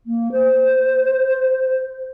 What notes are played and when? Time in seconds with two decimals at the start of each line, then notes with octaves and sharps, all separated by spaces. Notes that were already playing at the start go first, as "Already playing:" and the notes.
0.06 A#3
0.32 C5